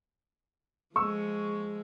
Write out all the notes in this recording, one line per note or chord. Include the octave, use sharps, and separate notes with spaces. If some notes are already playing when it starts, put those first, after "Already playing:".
F3 G#3 C#6 E6